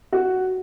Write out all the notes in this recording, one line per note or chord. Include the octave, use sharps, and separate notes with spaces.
F#4